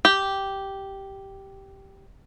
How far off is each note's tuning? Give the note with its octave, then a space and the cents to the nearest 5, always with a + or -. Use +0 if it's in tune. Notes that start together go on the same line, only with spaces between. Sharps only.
G4 -5